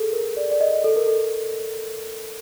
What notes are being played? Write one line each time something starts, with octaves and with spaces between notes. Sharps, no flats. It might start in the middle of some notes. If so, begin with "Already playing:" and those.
Already playing: G#4 A4
A#4
D5
D5
D#5
A4
A#4
A4